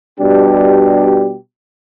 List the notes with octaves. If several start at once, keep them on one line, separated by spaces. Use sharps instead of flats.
B2 G3 D4 G4